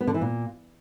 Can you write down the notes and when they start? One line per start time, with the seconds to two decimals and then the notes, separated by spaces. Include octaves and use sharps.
0.01 B3
0.07 D3
0.14 E3
0.21 A#2